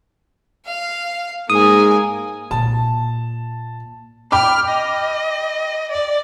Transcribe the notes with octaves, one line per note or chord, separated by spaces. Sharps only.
F5
G#2 A#3 G#5 D#6
A#2 A5
G5 B5 D6 F6
D#5
D5